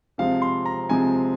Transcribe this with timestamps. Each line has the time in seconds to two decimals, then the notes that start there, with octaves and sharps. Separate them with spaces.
0.18 C3 F3 G#3 C4 F5
0.42 C6
0.66 A#5
0.89 C3 F3 G#3 C4 G#5